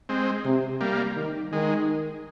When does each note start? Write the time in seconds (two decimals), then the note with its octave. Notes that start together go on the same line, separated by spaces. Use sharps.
0.09 G#3 C4
0.45 C3
0.81 G3 A#3
1.16 D#3
1.52 D#3 G#3